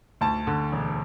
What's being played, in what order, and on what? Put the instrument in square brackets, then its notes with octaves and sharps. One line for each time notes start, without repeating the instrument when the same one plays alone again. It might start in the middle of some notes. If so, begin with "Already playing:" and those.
[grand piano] D2 [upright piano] A5
[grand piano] D3
E1